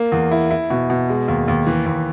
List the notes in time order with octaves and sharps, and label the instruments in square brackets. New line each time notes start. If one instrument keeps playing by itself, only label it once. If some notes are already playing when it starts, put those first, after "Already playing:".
Already playing: [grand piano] A#3
E2
E4
E4
B2
B2
G#3
D#2
D#2
E3
D#2